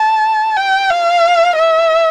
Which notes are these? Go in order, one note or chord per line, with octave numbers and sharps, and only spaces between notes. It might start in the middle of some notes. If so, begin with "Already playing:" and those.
Already playing: A5
G5
F5
E5